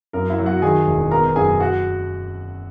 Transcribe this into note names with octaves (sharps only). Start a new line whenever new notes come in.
F#2 A#4
E4 E5
F#3
F#4 F#5
D#3 G#4 G#5
E1
B3 A#4 A#5
F#2 G#4 G#5
F#4 F#5